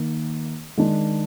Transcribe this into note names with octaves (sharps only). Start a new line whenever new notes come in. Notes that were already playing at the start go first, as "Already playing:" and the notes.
Already playing: D#3 A#3
D#3 G#3 D4